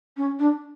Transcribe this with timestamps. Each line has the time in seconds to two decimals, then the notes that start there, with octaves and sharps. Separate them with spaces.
0.16 C#4
0.39 D4